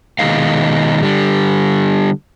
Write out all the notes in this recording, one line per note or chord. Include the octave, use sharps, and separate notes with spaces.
B2 D#3 G#3 D#4 F5
D3 G3